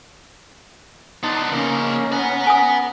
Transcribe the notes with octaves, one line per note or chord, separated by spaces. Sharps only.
B3 D4 D#4 A5 C6
C#3 A#3 C#4 D#4
B4 F#5 A#5
G#5 D#6